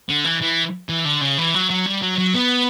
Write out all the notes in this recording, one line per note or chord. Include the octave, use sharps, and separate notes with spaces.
D3
E3
E3
E3
D3
C#3
E3
F#3
F#3
G3
F#3
F#3
B3